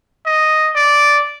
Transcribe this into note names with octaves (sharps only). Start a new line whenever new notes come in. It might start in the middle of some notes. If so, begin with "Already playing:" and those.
D#5
D5